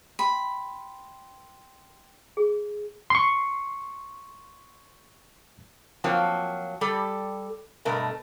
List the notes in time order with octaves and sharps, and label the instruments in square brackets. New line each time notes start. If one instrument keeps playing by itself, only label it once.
[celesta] G5 C6 [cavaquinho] B5
[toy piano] G#4
[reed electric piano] C6 C#6
[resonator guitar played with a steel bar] F3 F#3 A#3 C4 F4
G3 G4 A4
G2 B2 A3 A#4